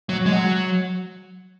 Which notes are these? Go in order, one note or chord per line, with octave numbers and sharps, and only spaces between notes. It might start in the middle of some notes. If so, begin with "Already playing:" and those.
F#3
G#3
F#3